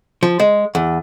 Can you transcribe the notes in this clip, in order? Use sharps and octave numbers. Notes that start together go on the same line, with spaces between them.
F3
G#3
E2